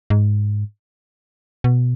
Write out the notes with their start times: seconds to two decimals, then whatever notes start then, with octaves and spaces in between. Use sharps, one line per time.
0.10 G#2
1.64 B2